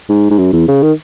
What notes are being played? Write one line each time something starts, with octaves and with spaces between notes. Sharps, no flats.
G#2
G#2
F#2
E2
C#3
D#3